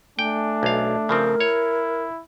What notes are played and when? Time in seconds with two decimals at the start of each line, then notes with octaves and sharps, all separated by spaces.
0.19 A3 D4 G5 G#5
0.63 B1 F5
1.09 C#3 F3 C4 A#4
1.40 E4 C#5